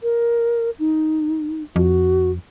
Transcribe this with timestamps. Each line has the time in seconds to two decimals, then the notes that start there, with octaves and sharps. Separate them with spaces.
0.03 A#4
0.79 D#4
1.76 F2 F#4